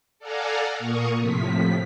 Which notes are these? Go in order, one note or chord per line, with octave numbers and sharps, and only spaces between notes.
A4 D5 F5 F#5 G#5 A#5
A#2 A#3 A#4 C#6 D#6
A2 C3 F3 B6